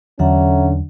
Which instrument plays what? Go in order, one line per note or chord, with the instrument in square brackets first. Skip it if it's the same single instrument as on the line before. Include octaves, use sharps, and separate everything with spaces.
[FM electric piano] E2 F#3 [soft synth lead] D3 [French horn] C#4 [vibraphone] E5 F#5 A#5